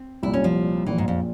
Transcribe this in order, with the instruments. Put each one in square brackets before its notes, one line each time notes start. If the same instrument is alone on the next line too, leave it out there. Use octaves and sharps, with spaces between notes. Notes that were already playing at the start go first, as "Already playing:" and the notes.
Already playing: [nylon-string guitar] C4
[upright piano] C2 A#2 G3 [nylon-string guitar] E4
[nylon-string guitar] C#4
F3
[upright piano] A#1 A#2 F3 [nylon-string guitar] E3
[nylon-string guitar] G#2
F2